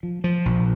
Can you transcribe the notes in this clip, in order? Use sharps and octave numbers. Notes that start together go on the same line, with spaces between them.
F3
F3
A#1